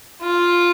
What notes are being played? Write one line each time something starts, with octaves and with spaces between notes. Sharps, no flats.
F4